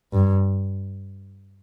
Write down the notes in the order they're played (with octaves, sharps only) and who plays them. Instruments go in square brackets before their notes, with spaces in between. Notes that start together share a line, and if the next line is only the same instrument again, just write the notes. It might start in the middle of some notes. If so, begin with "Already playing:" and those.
[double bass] G2